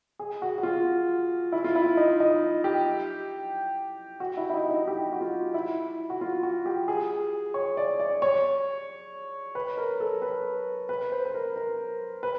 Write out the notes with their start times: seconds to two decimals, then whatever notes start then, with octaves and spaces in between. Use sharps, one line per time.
0.19 G#4
0.42 F#4
0.58 F#4
0.63 F4
1.52 E4
1.64 F4
1.76 E4
1.97 D#4
2.20 D#4
2.64 G4
4.20 F#4
4.37 E4
4.50 E4
4.54 D#4
4.71 D#4
4.88 G4
5.13 F#4
5.21 F4
5.54 E4
6.10 F#4
6.21 F4
6.43 F#4
6.66 G4
6.88 G#4
7.54 C#5
7.77 D5
8.00 D5
8.22 C#5
9.55 B4
9.77 A#4
10.00 A4
10.22 B4
10.89 B4
11.12 C5
11.25 B4
11.34 A#4
11.56 A#4
12.23 B4